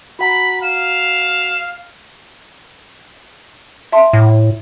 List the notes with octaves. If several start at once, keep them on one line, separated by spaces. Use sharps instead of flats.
F#4 F#5 A#5 B5
F5 E7
E5 A5 C6
A2